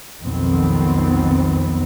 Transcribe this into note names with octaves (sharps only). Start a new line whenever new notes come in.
B1 F2 D#3 B3 C4